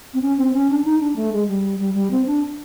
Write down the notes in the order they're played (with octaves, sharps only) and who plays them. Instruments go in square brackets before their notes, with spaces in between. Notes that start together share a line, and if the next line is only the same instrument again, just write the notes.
[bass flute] C4
C#4
C4
C#4
D4
D#4
D4
A3
G#3
G3
G3
G3
C4
D4